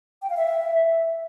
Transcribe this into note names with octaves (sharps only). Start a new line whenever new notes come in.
G5
F5
E5